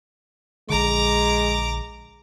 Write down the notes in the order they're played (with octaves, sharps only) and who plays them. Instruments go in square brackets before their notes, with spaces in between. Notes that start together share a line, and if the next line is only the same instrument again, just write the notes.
[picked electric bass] A#1 D3 [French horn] G#3 [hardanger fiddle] A#5 D6